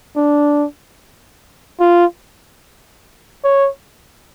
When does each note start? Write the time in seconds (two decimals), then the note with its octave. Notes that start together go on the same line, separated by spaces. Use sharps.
0.16 D4
1.80 F4
3.44 C#5